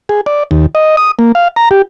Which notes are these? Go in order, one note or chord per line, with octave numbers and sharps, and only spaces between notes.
G#4
D5
D#2
D#5
D#6
A#3
F5
A#5
G4